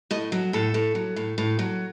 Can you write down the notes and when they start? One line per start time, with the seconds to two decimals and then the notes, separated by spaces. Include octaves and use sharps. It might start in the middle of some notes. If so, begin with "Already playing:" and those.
0.11 A2 D#5
0.32 F#3
0.53 A2 A4
0.74 A2
0.95 F#3
1.16 A2
1.38 A2
1.59 F#3